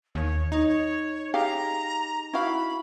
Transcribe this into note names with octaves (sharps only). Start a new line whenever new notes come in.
D#2 C#5
D#4 C#5
C#5
G4 G#4 F5 A#5
E4 F#4 F5 B5